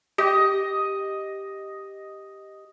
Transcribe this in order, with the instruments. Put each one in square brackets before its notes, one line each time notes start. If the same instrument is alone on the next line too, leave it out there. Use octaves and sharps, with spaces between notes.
[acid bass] G4 [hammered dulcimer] D#5